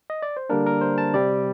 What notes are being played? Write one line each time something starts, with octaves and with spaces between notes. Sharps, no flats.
D#5
D5
C5
D3 G3 A#3 D4 A#4
A#4
C5
A5
C3 G3 C4 D5